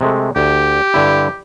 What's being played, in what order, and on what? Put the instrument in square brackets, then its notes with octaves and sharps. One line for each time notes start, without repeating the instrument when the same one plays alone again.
[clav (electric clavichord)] C3 G#3 A3
[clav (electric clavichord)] D2 [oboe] G4
[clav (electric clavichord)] G2 D3 E4